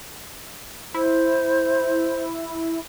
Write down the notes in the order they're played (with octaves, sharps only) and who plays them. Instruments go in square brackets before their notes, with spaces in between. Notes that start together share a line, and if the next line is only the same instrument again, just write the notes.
[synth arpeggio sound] E4 [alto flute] C5